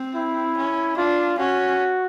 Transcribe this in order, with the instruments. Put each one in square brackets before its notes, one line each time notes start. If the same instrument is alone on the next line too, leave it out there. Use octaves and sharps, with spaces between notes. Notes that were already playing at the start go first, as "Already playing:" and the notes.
Already playing: [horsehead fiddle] C4
[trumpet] E4
[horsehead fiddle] C#4
[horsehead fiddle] D4 [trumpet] F4
[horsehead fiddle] C#4 [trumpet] F#4